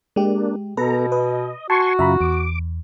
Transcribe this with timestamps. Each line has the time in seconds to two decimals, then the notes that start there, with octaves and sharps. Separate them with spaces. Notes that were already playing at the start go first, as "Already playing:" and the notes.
0.16 G#3 A#3 D4 G4
0.77 B2 B3 A4 B4 A#5
1.12 B4 D#5
1.70 F#4 G#5 A5 C6 C#6
1.99 F#2 C#3 F4 E5 A#5 B5
2.21 E2 D6